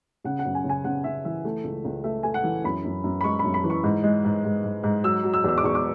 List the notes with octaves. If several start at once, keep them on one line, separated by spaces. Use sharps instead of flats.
C#3 F#5
F#5
F#2
G#5
C#3
G#5
C#3 F#5
C#3 E5
E3 E5
A3
C#2
C#2
A3 E5
A3 G#5
F#5
E3
F#2 B5
F#2
F#2
B5
G#3 C#6
F#2 B5
B5
E3
C#6
G#2
G#3
G#2
G#2
G#2
G#2
F#3 E6
F#3
E6
E2 E6
D6
E2 C#6
D6